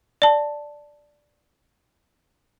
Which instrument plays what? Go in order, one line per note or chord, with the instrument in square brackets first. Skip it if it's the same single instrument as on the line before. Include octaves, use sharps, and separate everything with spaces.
[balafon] D5 A5